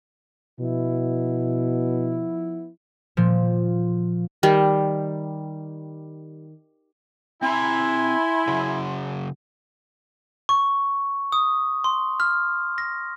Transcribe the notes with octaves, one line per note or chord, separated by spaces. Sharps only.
B2 F3 B3 E4
A#2 F3
D#3 G3
C4 E4 G#5 A#5 C6
C#3 F#3
C#6
D#6
C6
F6
A#6